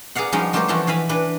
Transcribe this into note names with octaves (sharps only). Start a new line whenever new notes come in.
G#4 A#4 D5 F5 F#5
F3 G3 G#3 C#4 D#4 F#4
G3 A3 F4 G4 A#4 C5
E3 F3 A3 F4 F#4
E3 F5 G#5 B5
E3 D4 B4